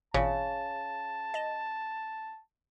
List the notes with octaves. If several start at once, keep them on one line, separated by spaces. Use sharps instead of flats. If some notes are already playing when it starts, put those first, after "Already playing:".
G#1 A#2 C#3 A5
D#5 E7